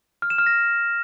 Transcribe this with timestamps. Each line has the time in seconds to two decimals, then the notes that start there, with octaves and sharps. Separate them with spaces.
0.22 F6
0.30 E7
0.38 F6
0.46 A#6